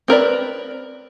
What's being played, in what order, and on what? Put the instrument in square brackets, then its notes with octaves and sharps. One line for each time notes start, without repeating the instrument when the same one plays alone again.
[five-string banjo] C4 A#4 B4 D5